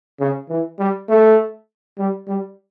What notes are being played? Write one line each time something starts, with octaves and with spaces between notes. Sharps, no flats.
C#3
E3
G3
A3
G3
G3